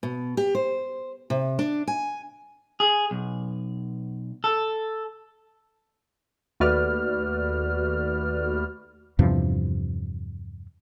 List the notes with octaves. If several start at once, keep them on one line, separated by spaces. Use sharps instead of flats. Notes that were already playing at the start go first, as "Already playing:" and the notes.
B2
G4
C5
C3
D4
G#5
G#4
B1
A4
D#2 A3 F#4 B4 D5 F6
E2 G2 C3 F3